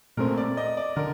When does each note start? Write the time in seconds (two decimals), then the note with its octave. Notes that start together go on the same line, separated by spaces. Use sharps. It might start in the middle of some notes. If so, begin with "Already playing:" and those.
0.17 A#2 A3 C4 A#4
0.37 D5
0.57 D#5
0.77 D5
0.96 D3 A#4